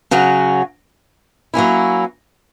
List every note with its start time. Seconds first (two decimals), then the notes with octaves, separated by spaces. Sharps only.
0.11 C#3 F#3 C#4 F#4
1.54 F#3 A#3 C#4 E4